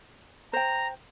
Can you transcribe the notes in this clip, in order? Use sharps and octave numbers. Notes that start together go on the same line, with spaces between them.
C5 G5 A#5